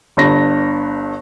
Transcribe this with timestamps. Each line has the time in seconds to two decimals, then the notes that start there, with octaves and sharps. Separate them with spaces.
0.17 G1 G2 A#6